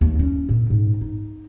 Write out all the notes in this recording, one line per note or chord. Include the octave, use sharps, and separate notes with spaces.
D#2 A3
C#4 E4
A#2 E4
G#2
D#4